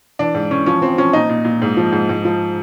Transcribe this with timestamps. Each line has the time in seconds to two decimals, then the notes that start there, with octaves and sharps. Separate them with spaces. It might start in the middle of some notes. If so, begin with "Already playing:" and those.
0.19 E3 D4
0.34 G#2
0.51 E3 C#4
0.66 F3 C#4
0.82 F3 C4
0.98 F3 C#4
1.13 A#2 D#4
1.29 A#2
1.45 A#2
1.62 G#2
1.77 F3
1.92 G#2
2.09 G#2
2.25 F3